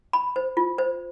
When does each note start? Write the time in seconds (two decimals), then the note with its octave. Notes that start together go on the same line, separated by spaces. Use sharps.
0.13 B5
0.36 C5
0.57 F4
0.78 C5